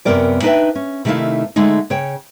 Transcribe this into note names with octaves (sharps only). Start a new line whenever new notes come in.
F#2 C3 B3 A#4 D5 G5
D4 D#4 B4 D5 E5 G5
C#4
C3 D#3 A3 D#4 E4 F5
D3 G#3 A3 D#4
C#3 C#5 G5